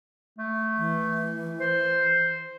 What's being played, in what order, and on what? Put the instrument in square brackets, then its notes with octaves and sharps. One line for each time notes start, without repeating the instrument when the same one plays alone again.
[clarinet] A3
[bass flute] E3
[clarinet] C5